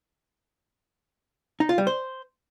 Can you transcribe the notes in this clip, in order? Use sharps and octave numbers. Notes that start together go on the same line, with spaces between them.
D#4
F4
G3
C5